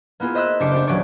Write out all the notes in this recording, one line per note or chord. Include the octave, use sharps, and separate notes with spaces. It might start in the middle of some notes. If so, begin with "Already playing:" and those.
A#3 B3 E4 F4 G#4
C5 D#5 E5 C6 E6 F#6
F#1 D4 G4 D6 C7 C#7
D4 G4 C5
D#1 F#3 C#4 C5 D5 C#6